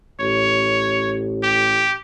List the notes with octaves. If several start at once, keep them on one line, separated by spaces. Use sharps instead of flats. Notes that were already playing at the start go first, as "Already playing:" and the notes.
A1 C#5
G4